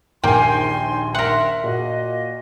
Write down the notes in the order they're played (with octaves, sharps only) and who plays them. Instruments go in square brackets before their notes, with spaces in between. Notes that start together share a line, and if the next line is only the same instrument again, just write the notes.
[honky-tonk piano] A#1 D#2 G6 [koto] A#3 [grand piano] G5 G#5 [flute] C6
[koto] A#4 F#5 [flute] E5 [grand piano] C6
[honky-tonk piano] A#2 A#3 F#4 [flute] D#5